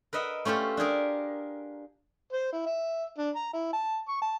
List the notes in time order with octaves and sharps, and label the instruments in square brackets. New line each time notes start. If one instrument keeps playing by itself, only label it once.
[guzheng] A#4 B4 D#5 E5 F#5
A3 C#4 F4 G4 A4
D4 G4 G#4 A#4
[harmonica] C5
E4
E5
D4
A#5
E4
A5
C#6
A5